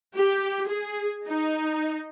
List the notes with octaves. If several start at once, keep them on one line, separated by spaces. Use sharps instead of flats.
G4
G#4
D#4